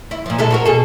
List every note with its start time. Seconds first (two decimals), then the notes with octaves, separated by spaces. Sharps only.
0.11 E4
0.26 A#2 F3
0.39 G#3 E4 A4
0.50 C4 F#4 A#4
0.65 B2 G#4 A4